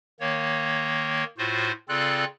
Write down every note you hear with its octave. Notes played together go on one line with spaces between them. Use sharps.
D#3 A#3 C#5
A2 F4 F#4 C5
C#3 C4 F4 A4 D5 F#6